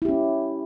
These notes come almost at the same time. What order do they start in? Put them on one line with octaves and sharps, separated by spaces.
E4 G4 C#4